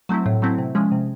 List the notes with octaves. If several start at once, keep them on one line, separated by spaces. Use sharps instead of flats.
F#3 A3 C4 E4
A2
F#3 A3 C4 E4
C3
F3 G#3 C#4
C3